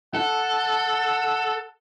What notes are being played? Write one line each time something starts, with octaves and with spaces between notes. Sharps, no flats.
A4 F#5